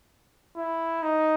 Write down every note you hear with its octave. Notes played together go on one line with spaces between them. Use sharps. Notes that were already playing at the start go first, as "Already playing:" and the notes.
E4
D#4